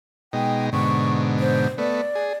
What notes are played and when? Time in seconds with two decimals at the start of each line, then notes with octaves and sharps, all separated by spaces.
0.33 B2 G#3 D#4 G5
0.73 G#2 B2 D3 C#6
1.40 C5
1.78 A3 B3 D5
2.15 G#4